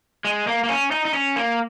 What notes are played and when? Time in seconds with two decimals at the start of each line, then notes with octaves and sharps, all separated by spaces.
0.25 G#3
0.47 A#3
0.64 A#3
0.69 C#4
0.91 D#4
1.05 D#4
1.14 C#4
1.36 A#3